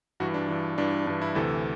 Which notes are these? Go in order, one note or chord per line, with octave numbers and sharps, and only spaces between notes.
G2 E3 F#4
D4
G2 E3
G2 E3 D4
G2 E3 D4
E4
D2 C3 E3 A4